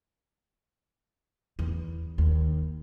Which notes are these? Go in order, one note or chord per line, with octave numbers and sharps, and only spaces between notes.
E2
D#2